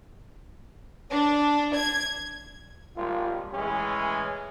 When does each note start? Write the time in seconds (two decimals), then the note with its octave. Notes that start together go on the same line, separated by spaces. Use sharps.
1.11 D4
1.76 G#6
2.96 G#1 G3 A#3 F4
3.53 A2 E3 G#3 C#4 G#4